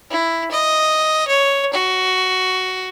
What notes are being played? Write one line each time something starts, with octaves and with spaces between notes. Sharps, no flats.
E4
D#5
C#5
F#4